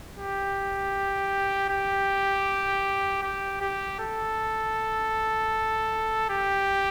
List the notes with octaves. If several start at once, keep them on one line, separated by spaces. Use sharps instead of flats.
G4
G4
G4
G4
A4
G4